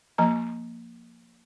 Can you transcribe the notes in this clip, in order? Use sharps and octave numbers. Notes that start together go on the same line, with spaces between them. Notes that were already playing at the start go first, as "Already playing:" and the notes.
F3 A#3 A#5